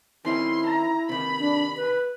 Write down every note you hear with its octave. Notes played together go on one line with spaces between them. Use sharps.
D#3 C4 C#4 E4 C6
A#5
C3 D#3 B5
D4
B4